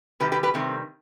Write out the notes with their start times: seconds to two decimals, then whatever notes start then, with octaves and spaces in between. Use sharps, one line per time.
0.20 C3 D#3 G3 G4 B4
0.32 G4 B4
0.43 G4 B4
0.54 C3 D#3 G3 A3 C4